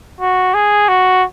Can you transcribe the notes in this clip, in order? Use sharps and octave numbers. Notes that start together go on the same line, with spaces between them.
F#4
G#4
F#4